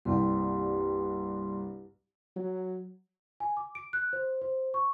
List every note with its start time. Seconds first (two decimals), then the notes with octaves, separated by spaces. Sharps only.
0.05 C2 G2 A#3 C4 G4 C6
2.36 F#3
3.40 G#5
3.57 D6
3.75 D7
3.93 F#6
4.13 C5
4.42 C5
4.74 C#6